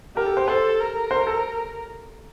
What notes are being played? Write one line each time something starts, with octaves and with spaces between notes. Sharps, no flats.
G4 A#4
A4
C5
A4 C5
A#4
C5
A4